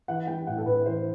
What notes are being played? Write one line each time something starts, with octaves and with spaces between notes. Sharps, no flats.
E3 F#5
G3 G5
A2 F#5
A4
A2 B4
E3 C5